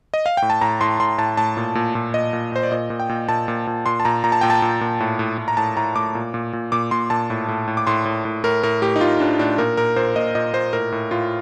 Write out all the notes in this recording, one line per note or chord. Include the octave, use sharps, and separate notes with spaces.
D#5
F5
A2 G5
A5
A2 A#5
A2 C6
A2 C6
A2 A5
A2 A5
A#2
A#2
A#2
A#2 D#5
A#2
A#2 C5
D5
A#2 D#5
A#2
G5
A#2
A#2 A5
A#2
A#2
A#2 C6
A5
A#2 A#5
A#2 A#5
A5
A#2 G5
A5
A#2
A#2
A2
A2
A2
A#5
A2 A5
A2 A#5
A2 D6
A#2
A#2
A#2
A#2 D6
A#2 C6
A#2 A5
A2
A2
A2
D6
A2 C6
A2
A2
A2 A#4
A2 A#4
A2 G4
D#4
A2 F4
A2 D4
A2 D4
A#2 A#4
A#2 A#4
A#2 C5
A#2 D#5
A#2 D#5
A#2 C5
A2 A#4
A2
A2 F4